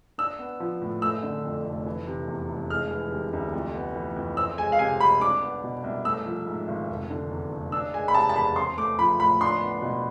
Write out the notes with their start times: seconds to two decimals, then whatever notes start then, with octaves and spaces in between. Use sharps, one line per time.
0.18 D4 E6
0.39 B3
0.60 F3
0.82 A2
1.02 A3 E6
1.23 D3
1.44 F2
1.65 F1
1.86 E3
2.07 C3
2.28 E2
2.49 F1
2.70 G#3 F6
2.91 E3
3.11 C3
3.33 D2
3.54 F2
3.75 B3
3.96 E3
4.16 F2
4.37 C4 E6
4.58 G#3 G#5
4.72 F5
4.79 C3 G#5
5.01 C2 B5
5.21 D4 D6
5.42 B3
5.64 B2
5.84 C2
6.05 A3 E6
6.26 F3
6.47 G#2
6.68 G#1
6.89 F1
7.10 D3
7.31 E2
7.52 F1
7.72 D4 E6
7.94 G#3 G#5
8.08 B5
8.14 C3 A5
8.29 A5
8.36 E2 B5
8.56 C4 C6
8.77 A3 D6
8.99 F3 B5
9.20 A2 B5
9.41 D4 C6
9.61 B3
9.82 B2